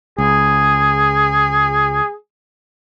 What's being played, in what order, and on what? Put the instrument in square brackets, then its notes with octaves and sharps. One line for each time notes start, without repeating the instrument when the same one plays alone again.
[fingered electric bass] C#2 [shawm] G#4